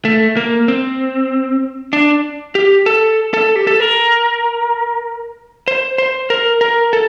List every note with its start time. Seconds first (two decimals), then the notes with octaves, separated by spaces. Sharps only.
0.05 A3
0.37 A#3
0.68 C4
1.93 D4
2.55 G4
2.86 A4
3.34 A4
3.56 G4
3.67 A4
3.80 A#4
5.68 C5
5.98 C5
6.30 A#4
6.61 A#4
6.93 A4